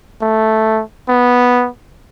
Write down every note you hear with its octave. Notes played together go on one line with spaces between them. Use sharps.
A3
B3